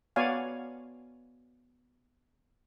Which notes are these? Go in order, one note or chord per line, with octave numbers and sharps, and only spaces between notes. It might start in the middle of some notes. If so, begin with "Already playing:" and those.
B3 F#4 C#5 D5 F5 G#5